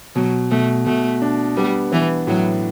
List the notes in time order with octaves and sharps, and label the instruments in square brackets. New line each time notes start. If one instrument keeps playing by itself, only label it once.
[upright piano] B2 [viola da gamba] F#3
[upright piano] B2 [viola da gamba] A3
[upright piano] B2 [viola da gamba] A3
[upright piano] D4
[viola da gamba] G3 [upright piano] B3
[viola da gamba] E3 [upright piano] B3
[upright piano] A2 [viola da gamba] F#3